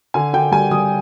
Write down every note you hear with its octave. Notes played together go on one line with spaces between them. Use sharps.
D3 G#5
D3 G5
G3 G#5
G3 D#6